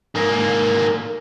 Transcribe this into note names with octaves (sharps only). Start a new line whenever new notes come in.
G#2 A#3